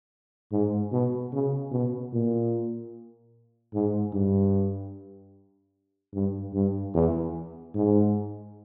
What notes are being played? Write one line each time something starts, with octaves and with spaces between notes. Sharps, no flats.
G#2
B2
C#3
B2
A#2
G#2
G2
G2
G2
E2
G#2